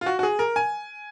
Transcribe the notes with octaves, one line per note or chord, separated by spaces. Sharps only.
F4
F#4
F#4
G#4
A#4
G#5